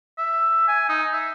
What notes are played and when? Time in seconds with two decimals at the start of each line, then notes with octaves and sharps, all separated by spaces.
0.18 E5
0.68 G#5
0.89 D#4
1.13 E5